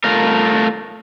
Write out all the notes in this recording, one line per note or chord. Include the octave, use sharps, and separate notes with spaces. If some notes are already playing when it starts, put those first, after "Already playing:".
A3 F4 A#4